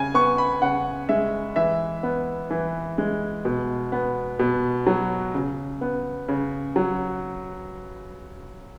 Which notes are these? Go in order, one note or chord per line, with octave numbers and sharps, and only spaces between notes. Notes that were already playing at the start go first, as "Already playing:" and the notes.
Already playing: C#3 G#5
B3 C#6
B5
C#3 F#5
G#3 E5
E3 E5
B3
E3
G#3
B2
B3
B2
F#3
C#3
B3
C#3
F#3